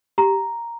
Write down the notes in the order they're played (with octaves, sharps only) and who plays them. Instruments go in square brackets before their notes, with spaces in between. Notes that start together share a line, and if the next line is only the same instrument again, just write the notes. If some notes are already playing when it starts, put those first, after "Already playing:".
[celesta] G4 A#5